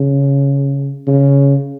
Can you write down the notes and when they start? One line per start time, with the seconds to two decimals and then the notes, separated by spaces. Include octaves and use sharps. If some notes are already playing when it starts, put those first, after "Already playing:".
Already playing: C#3
1.07 C#3